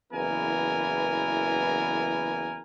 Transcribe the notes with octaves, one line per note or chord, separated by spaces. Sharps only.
F#1 E2 E3 B3 A#4 G#5